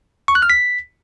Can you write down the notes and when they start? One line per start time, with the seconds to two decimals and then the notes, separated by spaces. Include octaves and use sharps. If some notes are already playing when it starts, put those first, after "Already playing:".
0.28 C#6
0.35 F#6
0.42 F6
0.50 B6